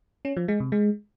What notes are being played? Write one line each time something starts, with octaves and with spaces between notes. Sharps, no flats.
C#4
F3
G#3
C3
G#3